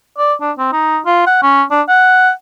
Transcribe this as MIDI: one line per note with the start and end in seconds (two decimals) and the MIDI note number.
0.18 0.33 74
0.41 0.52 62
0.58 0.68 60
0.73 0.99 63
1.06 1.25 65
1.27 1.41 78
1.42 1.63 61
1.71 1.82 62
1.88 2.31 78